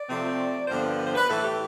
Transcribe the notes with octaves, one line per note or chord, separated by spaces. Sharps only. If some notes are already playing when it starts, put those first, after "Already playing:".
Already playing: D5
C3 F3 A3 C4
G2 D3 F3 B3 D4 C5
B4
B4
C5
B4
A2 E3 A3 A4
G4